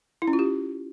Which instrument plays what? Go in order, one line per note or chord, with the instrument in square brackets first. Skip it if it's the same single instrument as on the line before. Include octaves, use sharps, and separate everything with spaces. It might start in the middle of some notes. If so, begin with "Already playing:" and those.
[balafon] E4
C#4
F4
G4